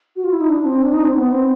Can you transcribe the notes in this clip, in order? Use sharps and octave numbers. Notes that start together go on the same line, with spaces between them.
F#4
F4
E4
D#4
D4
C4
D4
D#4
C4
B3
C4